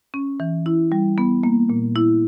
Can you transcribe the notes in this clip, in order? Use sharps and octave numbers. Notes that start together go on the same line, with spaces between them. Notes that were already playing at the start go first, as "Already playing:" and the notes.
C#4
E3
E4
G3
B3
A#3
A#2
E4